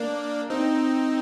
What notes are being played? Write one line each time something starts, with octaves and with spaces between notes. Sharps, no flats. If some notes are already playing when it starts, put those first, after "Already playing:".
Already playing: A#3 D4
C4 D#4